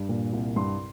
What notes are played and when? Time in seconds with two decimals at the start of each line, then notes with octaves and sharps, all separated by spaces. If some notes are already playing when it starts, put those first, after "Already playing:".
Already playing: G2
0.09 A#2
0.33 C2
0.56 G2 C6